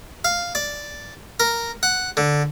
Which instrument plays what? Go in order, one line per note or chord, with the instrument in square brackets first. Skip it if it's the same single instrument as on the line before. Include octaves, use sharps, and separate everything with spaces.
[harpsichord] F5
D5
A#4
F#5
D3